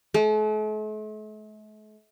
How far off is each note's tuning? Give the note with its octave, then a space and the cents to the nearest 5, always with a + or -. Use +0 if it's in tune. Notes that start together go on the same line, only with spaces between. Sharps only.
A3 -45